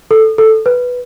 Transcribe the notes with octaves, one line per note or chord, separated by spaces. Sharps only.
A4
A4
B4